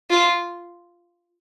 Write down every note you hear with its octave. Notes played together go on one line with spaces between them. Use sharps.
F4